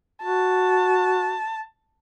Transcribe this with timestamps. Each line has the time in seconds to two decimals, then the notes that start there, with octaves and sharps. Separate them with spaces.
0.23 F#4 A5